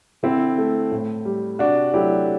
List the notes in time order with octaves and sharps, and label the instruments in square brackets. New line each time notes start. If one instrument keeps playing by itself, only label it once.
[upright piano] D3 C4 E4
A3
A2
G3
C3 D4 F#4
F#3 A3 E4 G4